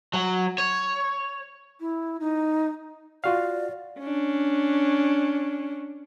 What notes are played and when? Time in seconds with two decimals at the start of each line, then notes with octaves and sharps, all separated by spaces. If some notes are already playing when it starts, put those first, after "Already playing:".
0.13 F#3
0.58 C#5
1.80 E4
2.20 D#4
3.24 F4 F#4 D5 F5
3.99 C#4 D4